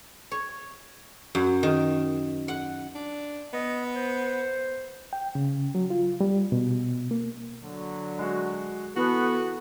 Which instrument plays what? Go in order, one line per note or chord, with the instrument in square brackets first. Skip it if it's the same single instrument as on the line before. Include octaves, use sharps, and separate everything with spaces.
[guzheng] C#5
F#2
D#3
F#5
[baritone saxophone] D4
[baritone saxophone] B3 [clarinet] D#5
[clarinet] C5
[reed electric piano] G5
C#3
F#3
F4
G3
B2
A#3
[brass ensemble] D3 F#3
[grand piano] G#3 F#4
[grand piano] E3 [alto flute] B3 [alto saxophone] F#4 [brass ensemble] A4